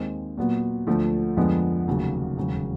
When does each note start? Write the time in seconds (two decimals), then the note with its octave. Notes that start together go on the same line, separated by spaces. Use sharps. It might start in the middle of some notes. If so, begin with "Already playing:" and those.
Already playing: D#2 D#3 G#3 C4 D#4
0.37 A#2 F#3 B3
0.87 D2 D3 F3 A3
1.37 F2 D3 F3 G#3 B3
1.87 F1 D#2 C#3 F#3
2.37 E1 D#2 C#3 F#3